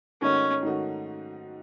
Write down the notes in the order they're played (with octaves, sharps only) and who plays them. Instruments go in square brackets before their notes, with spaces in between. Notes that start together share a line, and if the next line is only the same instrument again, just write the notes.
[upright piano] G#2 D#3 A3 D#4 F#4 [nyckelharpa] C#4
[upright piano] G#2 D#3 A3 D#4 F#4